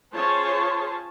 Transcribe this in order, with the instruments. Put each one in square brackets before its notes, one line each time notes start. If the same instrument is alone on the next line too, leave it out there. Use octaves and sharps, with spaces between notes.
[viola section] C#4 F4 G#4 C5 C#5 A5